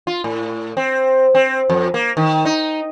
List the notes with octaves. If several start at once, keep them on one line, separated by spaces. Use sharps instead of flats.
F4
A2
C4
C4
F2
A#3
D#3
D#4